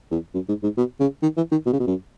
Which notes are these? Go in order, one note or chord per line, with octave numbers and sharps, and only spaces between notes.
E2
F#2
G#2
G#2
B2
C#3
D#3
E3
D#3
B2
C#3
B2
F#2